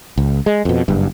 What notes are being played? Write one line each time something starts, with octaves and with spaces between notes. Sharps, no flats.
C#2
G#3
F2 B2
F#1 G2